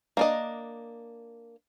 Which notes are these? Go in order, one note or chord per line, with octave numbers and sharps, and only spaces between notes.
A#3 D4 D#5